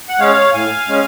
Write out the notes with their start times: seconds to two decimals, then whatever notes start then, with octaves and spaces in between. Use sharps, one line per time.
0.09 F#5
0.19 G#3 C#4 C#5 F5
0.53 A2 F5 G#5
0.88 G#3 C#4